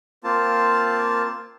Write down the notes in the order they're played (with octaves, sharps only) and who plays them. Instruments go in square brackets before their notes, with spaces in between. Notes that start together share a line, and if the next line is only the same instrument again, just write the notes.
[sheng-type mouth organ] A#3 C4 F4 A5